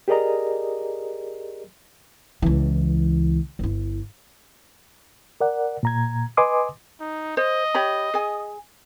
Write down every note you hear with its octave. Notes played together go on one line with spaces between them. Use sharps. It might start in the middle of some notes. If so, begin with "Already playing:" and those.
G4 G#4 A#4 D5 D#5 A#5
C#2 E3
G1 E4
A#4 D5 F#5
A#2 A#5 G#6
B4 D#5 G#5 C6 D6 D#6
D#4
C5 D#5
G4 C#5 B5
G#4 G#5